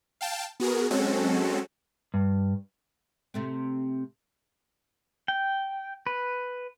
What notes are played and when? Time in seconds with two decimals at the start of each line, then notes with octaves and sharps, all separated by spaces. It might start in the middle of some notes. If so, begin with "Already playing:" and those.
0.21 F5 G5 A5
0.60 B3 F#4 G#4 A#4
0.90 F#3 G#3 C4 C#4 F#4 A4
2.14 G2
3.34 C3 A3 C4
5.28 G5
6.07 B4